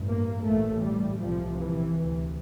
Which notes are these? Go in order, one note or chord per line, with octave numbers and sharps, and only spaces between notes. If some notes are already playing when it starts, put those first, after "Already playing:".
Already playing: A1 G2
A#3
A1 A2 A3
G3
C2 C3 F3
E3
D2 C3